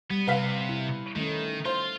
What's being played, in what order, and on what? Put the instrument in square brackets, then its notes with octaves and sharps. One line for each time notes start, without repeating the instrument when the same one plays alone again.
[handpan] G3 [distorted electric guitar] B3
[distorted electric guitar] C3 [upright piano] B4 F5 B6
[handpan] E4
[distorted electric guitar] D#3 [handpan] A3 C#4
[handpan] D#4
[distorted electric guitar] F4 [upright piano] C5